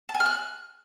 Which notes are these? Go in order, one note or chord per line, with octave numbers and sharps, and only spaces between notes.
A5
G#5
F6
F#6